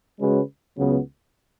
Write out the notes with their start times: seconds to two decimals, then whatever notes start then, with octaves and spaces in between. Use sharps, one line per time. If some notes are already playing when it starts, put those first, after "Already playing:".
0.20 C#3 G#3 C#4 F#4 B4
0.78 C#2 C#3 F#3 B3